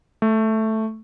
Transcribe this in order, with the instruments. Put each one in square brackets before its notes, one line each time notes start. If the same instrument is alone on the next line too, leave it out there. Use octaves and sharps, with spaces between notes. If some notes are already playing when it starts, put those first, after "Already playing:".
[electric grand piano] A3